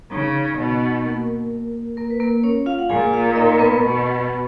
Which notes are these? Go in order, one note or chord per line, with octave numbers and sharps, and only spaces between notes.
C#3 D#4
B2
A#3 A#4
A#3 A#4
B4
A#3 A#4
C#4 C#5
F4 F5
F#5
A#2 G#4 G#5
F4 F5
D#4 D#5
B3 B4
B2